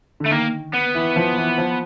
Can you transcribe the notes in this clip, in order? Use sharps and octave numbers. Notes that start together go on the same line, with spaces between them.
D3
A3
D#3 A#3
B3
E3
F3
E3
F3